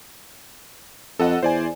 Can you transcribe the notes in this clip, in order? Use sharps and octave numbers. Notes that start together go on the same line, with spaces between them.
F2 A4 D#5 F#5
E2 C5 D5 G#5